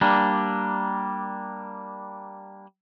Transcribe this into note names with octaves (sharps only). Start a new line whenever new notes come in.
G3 A#3 D4